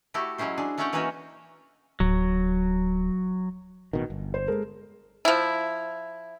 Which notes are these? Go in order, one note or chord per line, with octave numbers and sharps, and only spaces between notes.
A3 E4 F#4 G4 A4
F#3 G#3 C#4 E4 C5
D4 G#4
A3 C#4 A4 C#5 F#5 G5
E3 A#3 C#4 D#4 F#4 C#5
D1 F#3
A1 B2 D#3
G1
C5
G#3 A4 A#4
F3 E4